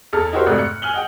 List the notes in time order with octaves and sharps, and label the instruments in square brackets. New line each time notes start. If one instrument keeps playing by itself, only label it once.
[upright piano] E2 A4 F6
D#4 E4 F#4 G4 A#4 C5
G#1 F2 C3 A3 D5 F#6
F#6 C#7
G#5 F6 F#7 G7
D#5 F#5 G5